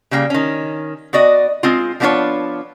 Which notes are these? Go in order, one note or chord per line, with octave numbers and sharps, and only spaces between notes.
C#3 G3 A#3 G5
D#3 C#4
B3 F#4 D5 D#5
G#3 C4 F4
F3 G3 B3 D4 F4 C#5